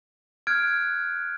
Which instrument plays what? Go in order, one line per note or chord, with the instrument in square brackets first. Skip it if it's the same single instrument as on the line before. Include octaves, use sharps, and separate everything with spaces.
[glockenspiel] F6 F#6 G#6 D7